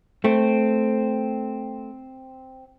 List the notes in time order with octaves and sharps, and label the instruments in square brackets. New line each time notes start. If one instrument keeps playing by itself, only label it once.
[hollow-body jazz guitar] A3 [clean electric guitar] C4